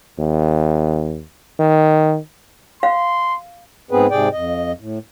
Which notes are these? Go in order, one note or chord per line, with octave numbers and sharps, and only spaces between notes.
D#2
D#3
F5 C6
G#2 B3 C4 G#4 B4
G#2 C3 G#4 D5 G5
F2 D#5
A2